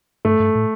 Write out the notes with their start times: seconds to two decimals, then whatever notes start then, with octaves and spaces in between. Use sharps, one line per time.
0.25 G2 A3
0.40 G2
0.55 A2